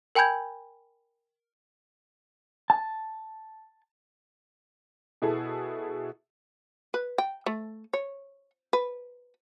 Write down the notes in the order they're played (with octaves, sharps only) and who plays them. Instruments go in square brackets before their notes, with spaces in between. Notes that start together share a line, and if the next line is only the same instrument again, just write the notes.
[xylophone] A#4 G5 G#5 B5 G6 G#6
[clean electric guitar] A5
[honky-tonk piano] B2 E4 G#4 A4
[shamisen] B4
G5
A3
C#5
B4